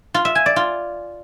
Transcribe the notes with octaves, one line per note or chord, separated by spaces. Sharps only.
F4
E5
G#5
D5
F4